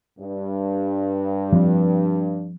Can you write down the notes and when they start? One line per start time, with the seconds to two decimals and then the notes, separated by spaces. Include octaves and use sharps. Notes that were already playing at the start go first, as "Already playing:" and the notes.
0.19 G2
1.52 F3 G3 C4